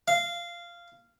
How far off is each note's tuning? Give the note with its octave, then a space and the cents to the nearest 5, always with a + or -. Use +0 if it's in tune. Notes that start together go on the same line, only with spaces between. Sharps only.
F5 -15